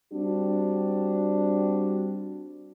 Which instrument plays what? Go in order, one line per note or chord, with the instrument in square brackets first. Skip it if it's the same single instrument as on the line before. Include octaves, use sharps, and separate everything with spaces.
[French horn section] G3 C4 D4 F#4